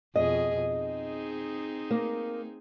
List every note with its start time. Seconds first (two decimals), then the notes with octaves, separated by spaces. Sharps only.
0.16 F2 B2 G#4 D#5
0.69 C4 D#4 G#4
1.91 A#3